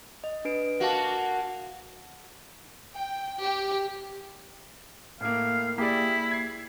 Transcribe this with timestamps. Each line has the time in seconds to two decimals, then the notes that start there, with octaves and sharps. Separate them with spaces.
0.24 D#5
0.45 D4 B4 D7
0.80 A#3 F#4 F5 A5
2.94 G5
3.41 G4
5.21 A2 A#3 F5
5.78 A#3 E4 G4 G#4 D5
6.31 G#6 C7